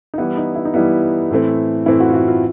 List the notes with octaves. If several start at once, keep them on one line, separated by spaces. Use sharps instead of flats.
D#4
E3 G3 B3 E4
D#4
E4
D#4
E3 G3 B3 E4
A2 E3 A3 C4
A2 E3 A3 C4 E4
F#4
F4
F#4
F4